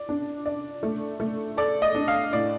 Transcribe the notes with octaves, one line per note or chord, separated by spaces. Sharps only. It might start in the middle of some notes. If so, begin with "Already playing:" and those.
Already playing: D5
D4
D5
A3
A3
A4 D5
D#5
D4
F5
A2 D5